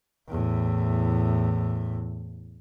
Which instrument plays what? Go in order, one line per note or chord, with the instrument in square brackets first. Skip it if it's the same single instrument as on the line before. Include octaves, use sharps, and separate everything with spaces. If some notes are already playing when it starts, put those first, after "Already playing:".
[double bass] E2 A2